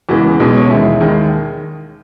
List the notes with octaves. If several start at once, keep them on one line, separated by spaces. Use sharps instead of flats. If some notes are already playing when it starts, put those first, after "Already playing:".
E2 C#3 E3 G#3 F#4
B1 B2 G#3 D#4
C#4
E1 D#2 D#3 G#3 E4
D#2 D#3 G#3